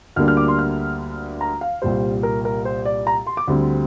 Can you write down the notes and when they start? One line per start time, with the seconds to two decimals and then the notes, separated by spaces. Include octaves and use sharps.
0.16 D2 D3 G3 A#3 D4 F6
0.28 F6
0.37 D6
0.48 C6
0.59 F6
1.41 A#5
1.61 F5
1.82 C2 A#2 G3 C5
2.23 A#4
2.45 A#4
2.65 C5
2.85 D5
3.07 A#5
3.27 C6
3.37 D6
3.48 D2 D3 G3 C4